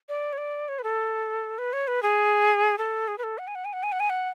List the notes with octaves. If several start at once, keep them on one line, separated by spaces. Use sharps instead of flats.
D5
C#5
D5
C#5
B4
A4
B4
C#5
B4
G#4
A4
G#4
B4
A4
F#5
G#5
F#5
G#5
F#5
G#5
F#5
G#5
F#5